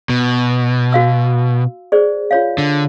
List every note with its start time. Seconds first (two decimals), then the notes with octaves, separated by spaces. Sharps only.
0.09 B2
0.92 F#4 F5 E6
1.92 G#4 C5 D5
2.31 F4 C#5 F5
2.58 D3